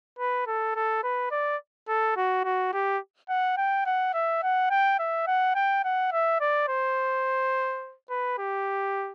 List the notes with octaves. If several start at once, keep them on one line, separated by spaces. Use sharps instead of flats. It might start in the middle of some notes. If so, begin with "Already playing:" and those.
B4
A4
A4
B4
D5
A4
F#4
F#4
G4
F#5
G5
F#5
E5
F#5
G5
E5
F#5
G5
F#5
E5
D5
C5
B4
G4